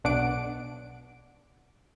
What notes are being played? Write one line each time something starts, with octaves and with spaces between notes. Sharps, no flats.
B1 D4 F#5 D6 D7